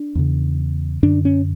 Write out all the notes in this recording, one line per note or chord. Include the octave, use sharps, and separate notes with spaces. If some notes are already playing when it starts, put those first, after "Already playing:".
Already playing: D4
E2 C#3
F#2 D3 D4
C#4